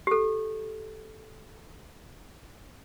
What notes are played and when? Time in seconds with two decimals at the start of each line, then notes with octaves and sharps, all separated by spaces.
0.07 G4 A4